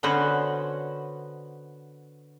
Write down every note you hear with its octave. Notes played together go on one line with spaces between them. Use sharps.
D3 B3 C#4 F#4 B4 C5